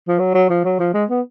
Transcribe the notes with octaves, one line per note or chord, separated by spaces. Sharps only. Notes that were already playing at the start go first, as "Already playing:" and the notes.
F3
F#3
F#3
F3
F#3
F3
G#3
B3